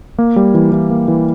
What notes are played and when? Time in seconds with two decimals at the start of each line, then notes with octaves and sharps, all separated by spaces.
0.19 A#3
0.36 G3
0.54 E3
0.72 E3
0.90 A#3
1.08 E3